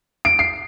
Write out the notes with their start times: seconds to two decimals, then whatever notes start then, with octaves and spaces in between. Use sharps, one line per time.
0.25 D7
0.39 C7